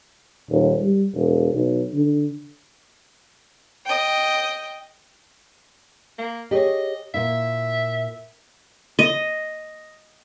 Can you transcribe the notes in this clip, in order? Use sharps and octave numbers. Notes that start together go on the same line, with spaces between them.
D#1
G3
E1
B1
D3
D#5 G5
A#3
G4 G#4 C#5 D#5
A#2 E4 E5
D#5